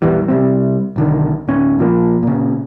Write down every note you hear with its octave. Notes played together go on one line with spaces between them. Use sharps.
A#1 E2 E3 G3
C3 G3 C4
B1 D3 D#3
D1 C#4
A#2 F3 A#3
A#2 C#3